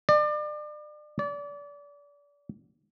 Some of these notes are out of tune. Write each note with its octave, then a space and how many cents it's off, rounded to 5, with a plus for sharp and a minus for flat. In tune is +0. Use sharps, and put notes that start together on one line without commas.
D5 +35
D5 -30